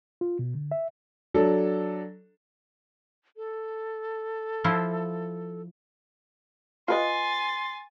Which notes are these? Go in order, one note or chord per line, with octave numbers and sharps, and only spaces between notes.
F4
B2
D3
E5
F#3 D4 A4
A4
F3 E4 F4
F4 B4 D#5 G#5 C6 A6